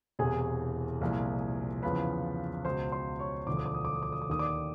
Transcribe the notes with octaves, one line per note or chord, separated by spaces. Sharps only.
E1 E2 C3 E3 G#4 G#5
C2 A#2 F3
E2 C#3 F3 B4 B5
C#2 B2 C5 C6
C5 C6
C#5 C#6
E1 D2 D3 F3 D6
D#6
D6
D#6
D6
D#6
D6
D#6
D6
D#2 D#3 D#6
D5 D6